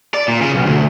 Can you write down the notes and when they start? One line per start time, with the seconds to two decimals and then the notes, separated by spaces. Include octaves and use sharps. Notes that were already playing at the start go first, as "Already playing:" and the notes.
0.14 D5
0.28 A#2
0.41 C#3
0.55 B1
0.66 D2